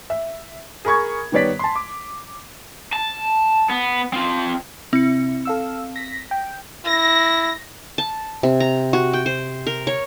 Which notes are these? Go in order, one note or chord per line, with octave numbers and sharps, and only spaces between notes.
E5
G#4 A#4 B5 C#6 G#6
D#3 G3 B3 C#5 D5 B6
A5 C6
D6
A5
B3
C4 F4
C3 C4 E4 C#7
A4 F5 E6
A#6 B6
G5
E4 A#6
A5
C3
A#5
F#4
G5
C5
A#4
C#5